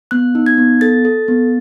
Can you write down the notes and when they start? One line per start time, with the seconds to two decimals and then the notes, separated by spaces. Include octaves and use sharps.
0.11 B3 F#6
0.35 D#4
0.46 G#6
0.58 B3
0.81 A4 A6
1.05 A4
1.28 B3